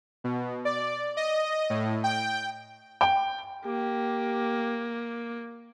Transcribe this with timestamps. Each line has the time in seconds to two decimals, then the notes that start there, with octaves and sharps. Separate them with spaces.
0.24 B2
0.65 D5
1.17 D#5
1.70 A2
2.04 G5
3.01 G5
3.66 A#3 G4